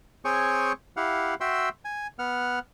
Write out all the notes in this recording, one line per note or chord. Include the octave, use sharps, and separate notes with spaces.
C4 G#4 C#5 G5 G#5 C#6
E4 G4 F5 F#5
F#4 E5 G5 C6 E6
G#5
B3 F#5 F6